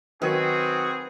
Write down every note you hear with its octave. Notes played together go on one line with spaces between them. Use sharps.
D#3 F#3 C4 F#4 G#4 B4